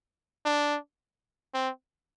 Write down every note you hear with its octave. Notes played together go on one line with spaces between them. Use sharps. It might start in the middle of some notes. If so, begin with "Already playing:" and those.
D4
C4